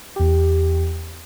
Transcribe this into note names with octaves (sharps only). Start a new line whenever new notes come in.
E2 G4